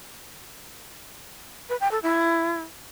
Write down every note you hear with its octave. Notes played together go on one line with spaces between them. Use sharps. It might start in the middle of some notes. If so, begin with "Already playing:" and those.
B4
G5
A4
E4